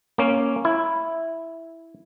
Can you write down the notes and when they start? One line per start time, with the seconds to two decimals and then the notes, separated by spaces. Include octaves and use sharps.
0.18 A#3 C#4
0.65 E4